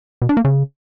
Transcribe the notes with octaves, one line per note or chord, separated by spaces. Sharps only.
B2
D4
A#3
C#3